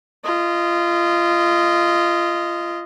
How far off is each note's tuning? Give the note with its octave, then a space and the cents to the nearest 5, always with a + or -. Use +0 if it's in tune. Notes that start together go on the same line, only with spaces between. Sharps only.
F4 -25 D#5 +0